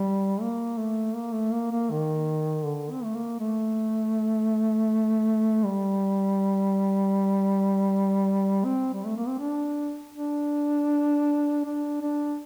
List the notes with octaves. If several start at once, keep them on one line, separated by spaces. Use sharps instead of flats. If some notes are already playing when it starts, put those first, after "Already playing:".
Already playing: G3
A#3
A3
A#3
A3
A#3
A#3
D#3
D3
C4
A3
A#3
A3
G3
C4
G3
A3
A#3
C4
D4
D4
D4
D4